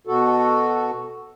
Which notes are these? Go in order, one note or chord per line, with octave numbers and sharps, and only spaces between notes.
B2 F#4 A4